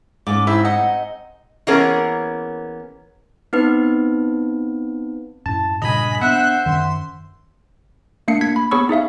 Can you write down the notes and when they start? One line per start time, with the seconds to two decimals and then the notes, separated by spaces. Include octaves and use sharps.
0.27 G#2 C#4 D6
0.47 C4 E4 G#4 E5
0.65 D#4 D#5 F#5
1.67 E3 A#3 B3 C#4 G#4 A#4
3.53 B3 C4 D#4 B4
5.46 F#2 A2 A5
5.82 G2 A#2 C#3 D#5 G#5 B5
6.21 B3 D4 C5 E5 F#5 F#6
6.66 F#2 D#3 C6
8.28 A3 A#3 D4 C7 C#7
8.41 A#3 G#6 B6
8.56 B5
8.71 B3 G#4 C#5 B5 C#6 E6
8.89 D#4 G#4 E5 F5